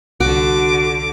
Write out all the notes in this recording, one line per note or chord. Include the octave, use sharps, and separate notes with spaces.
C2 D3 F#4 D6